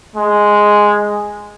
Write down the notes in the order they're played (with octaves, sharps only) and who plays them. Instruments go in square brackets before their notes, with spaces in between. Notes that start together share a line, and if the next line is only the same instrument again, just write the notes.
[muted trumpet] G#3